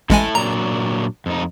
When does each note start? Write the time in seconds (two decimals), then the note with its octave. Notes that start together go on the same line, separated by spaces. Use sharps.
0.10 A1 G#3 E4 A4 G#5
0.35 A#2 F#3 D4 A#5
1.26 F2 D#4